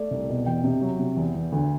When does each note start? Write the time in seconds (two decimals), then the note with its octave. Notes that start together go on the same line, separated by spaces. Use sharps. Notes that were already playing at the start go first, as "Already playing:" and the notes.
Already playing: A3 D5
0.11 C2
0.29 B2
0.46 E2 G5
0.64 C3
0.81 F#3
0.99 C3
1.17 E2
1.35 E2
1.52 D2